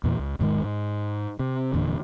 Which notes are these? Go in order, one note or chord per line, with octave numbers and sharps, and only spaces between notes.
E2 A#2 E3
C#2
E1 G#2 D#3 G#3
G#2
C3
F1 E2 A#2 D3